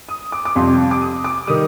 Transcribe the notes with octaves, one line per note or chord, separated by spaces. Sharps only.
D#6
D6
D6
F2 C3 G3 C6
D6
D#6
D6
D#3 G3 D#6